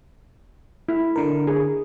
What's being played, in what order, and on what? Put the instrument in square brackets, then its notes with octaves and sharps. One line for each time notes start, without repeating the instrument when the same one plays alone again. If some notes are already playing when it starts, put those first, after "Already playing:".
[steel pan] E4
[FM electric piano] D3 A#4
[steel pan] G#4